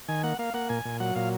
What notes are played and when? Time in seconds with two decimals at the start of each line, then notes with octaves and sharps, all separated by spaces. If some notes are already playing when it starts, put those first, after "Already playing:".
0.08 D#3 G#5
0.24 A#3 F#5
0.39 A#3 F5
0.54 A#3 F#5
0.69 A#2 G#5
0.85 A#2
1.00 F#3 F#5
1.15 A#2 F5